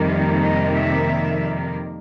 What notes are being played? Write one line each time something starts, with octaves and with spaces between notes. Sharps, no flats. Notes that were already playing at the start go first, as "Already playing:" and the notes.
Already playing: F2 C3 D#3 G3 A#3
D#5
E5